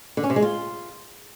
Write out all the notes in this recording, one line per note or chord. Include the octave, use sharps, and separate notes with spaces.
D3
C#4
C3
G#3
F4